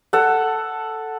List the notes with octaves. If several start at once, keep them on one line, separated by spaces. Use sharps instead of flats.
A4 F#5